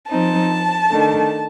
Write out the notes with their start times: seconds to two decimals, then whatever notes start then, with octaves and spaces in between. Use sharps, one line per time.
0.10 F3 C4 D#4 A5
0.91 D#3 A3 D4